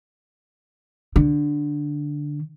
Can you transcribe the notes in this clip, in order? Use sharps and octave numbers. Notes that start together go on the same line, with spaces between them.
D3